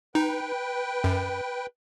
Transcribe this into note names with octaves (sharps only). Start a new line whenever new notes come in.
D#4 B4 G5
F#2